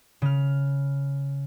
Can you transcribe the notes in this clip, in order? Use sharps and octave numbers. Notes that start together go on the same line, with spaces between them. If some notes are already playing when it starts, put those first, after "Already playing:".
C#3 F6